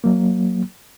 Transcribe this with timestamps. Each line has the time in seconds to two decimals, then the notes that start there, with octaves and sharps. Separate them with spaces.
0.04 F#3 A#3